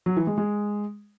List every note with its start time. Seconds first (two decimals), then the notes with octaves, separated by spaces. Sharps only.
0.06 F#3
0.17 E3
0.27 G#3
0.38 G#3